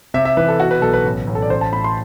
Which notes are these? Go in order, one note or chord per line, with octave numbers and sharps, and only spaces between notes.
C3 E5
E5
E3 B4
A4
B2 F#4
B4
B1 A4
B4
A1
A1
A4
D5
A1 C5
A5
A2 B5
C6